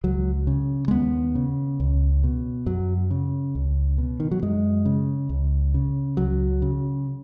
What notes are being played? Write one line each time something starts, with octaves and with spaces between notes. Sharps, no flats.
C#2 F#3
C#3
G#3
D#2 B3
C#3
C#2
B2
F#2 F#3
C#3
C#2
B2
D#3
F#3
F#2 G#3
C#3
C#2
C#3
C#2 F#3
C#3